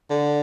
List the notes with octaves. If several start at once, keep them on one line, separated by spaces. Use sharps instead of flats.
D3